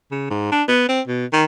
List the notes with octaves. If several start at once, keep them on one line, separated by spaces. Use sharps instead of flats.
C#3
G#2
D4
B3
C4
B2
D#3